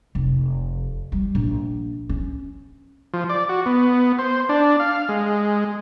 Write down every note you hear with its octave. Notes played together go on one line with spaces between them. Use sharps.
F1
G3
A#1
C#4
F3
D5
F#4
B3
C5
D4
F5
G#3